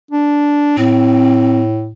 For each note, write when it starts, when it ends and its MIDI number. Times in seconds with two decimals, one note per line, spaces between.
0.11 0.73 62
0.78 1.92 45
0.78 1.60 60